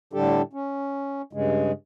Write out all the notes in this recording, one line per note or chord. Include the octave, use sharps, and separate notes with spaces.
A2 D3 G3 D4 G4 A4
C#4
G2 C#3 G#3